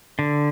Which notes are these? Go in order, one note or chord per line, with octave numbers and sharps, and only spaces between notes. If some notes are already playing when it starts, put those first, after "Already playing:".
D3